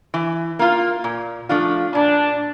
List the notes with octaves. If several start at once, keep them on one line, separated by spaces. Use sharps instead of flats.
E3
A#3 F4
A#2
F3 A3 D4 F4
A#2 D4